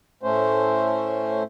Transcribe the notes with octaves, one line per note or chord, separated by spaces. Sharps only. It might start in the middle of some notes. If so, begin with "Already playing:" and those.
A2 A3 C#4 C5